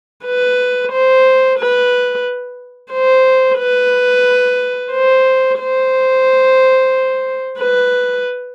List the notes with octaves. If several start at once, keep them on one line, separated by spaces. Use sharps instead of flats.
B4
C5
B4
C5
B4
C5
C5
B4